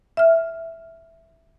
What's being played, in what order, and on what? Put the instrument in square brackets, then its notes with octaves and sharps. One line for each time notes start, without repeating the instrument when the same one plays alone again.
[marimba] E5 F6